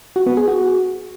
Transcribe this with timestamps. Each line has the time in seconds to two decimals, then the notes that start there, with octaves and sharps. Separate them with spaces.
0.16 F#4
0.26 B3
0.37 G#4
0.48 F#4